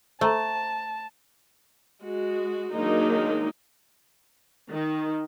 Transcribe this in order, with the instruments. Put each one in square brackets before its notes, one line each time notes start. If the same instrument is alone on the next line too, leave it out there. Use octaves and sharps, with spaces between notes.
[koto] A3 [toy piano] C5 A#5 [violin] A5
[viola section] G#3 F#4
D#3 F#3 G#3 A#3 D4 D#4
D#3